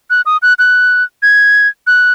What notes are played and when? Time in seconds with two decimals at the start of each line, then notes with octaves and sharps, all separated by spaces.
0.10 F#6
0.26 D#6
0.42 F#6
0.59 F#6
1.23 G#6
1.87 F#6